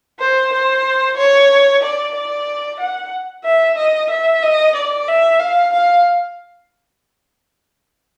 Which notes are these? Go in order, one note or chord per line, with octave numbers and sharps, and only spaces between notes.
C5
C5
C#5
D5
D5
F#5
E5
D#5
E5
D#5
D5
E5
F5
F5